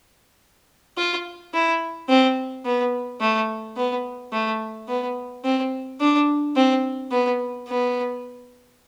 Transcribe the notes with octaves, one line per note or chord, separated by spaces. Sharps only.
F4
E4
C4
B3
A3
B3
A3
B3
C4
D4
C4
B3
B3